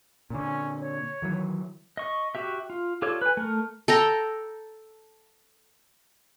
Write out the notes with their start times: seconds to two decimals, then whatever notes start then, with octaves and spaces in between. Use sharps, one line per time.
0.30 A#2 D3 C#4
0.80 C#5
1.22 D#3 E3 F#3
1.97 D#5 C#6
2.35 F#4 G4 E5
2.70 F4
3.02 F4 G4 A4 C#5 D5
3.21 B4 G#5
3.37 A3 A#4
3.88 A4 G5 A#5